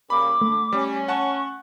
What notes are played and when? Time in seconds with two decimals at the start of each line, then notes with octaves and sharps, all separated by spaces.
0.10 C#3 G3 A#3 B5 D6
0.41 D3 A3
0.72 G3 C#4
1.08 F#5 A5 C#6 F#6